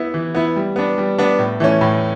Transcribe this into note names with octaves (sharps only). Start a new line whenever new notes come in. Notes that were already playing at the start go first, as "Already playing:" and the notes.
Already playing: B3 E4
E3
B3 E4
G3
B3 D4
G3
B3 D4
A2
E3 A3 C#4
A2